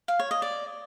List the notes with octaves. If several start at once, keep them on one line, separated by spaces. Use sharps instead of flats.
F5
C#5
D#5
D5